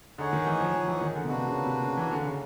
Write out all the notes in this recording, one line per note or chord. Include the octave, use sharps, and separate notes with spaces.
D3 D#4 G#4 C#5 F#5
D#3
E3
F3
F3
E3
D#3
D3
B2
C3 A#3 D4 F#4 B4
C#3
C3
C#3
E3
D3
C#3